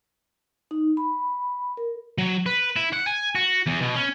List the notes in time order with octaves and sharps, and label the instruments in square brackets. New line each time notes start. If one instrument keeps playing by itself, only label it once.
[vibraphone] D#4
B5
A#4
[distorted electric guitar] F#3
B4
E4
F#5
G#5
F#4
E2
B2
C#4